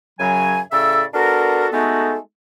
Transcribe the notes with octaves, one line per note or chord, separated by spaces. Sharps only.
F#2 C#3 F#3 G#5
A2 C#3 A4 D5 E5 E6
B3 D4 F#4 A4 A#4
G#3 A3 B3 D#4 F#4 A4